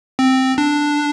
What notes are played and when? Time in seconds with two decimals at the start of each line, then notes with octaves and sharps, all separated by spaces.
0.19 C4
0.58 D4